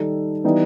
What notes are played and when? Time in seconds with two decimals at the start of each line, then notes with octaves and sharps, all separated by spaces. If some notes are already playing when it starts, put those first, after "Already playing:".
Already playing: D#3 G3 D#4 A4
0.44 E3 G3 B3 D#4